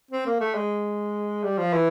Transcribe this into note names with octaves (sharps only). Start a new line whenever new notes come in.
C4
A#3
A3
G#3
G3
F3
E3